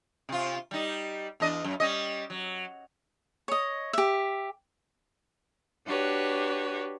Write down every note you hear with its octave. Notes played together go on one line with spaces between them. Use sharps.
C3 F4
G3 D#4
E2 D4 D#5
F#2
G3 C#4 D#5
F#3
C#5 D#5
G4 E5
D4 F#4 G4 B4 C#5